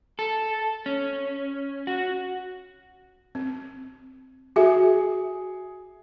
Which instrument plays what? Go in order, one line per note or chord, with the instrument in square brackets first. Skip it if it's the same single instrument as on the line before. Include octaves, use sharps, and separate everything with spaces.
[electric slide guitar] A4
C#4
F#4
[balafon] C4
[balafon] F#4 E5 [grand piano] G#4